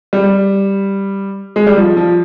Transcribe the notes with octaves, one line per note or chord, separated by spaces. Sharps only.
G3
G#3
G3
F3
F3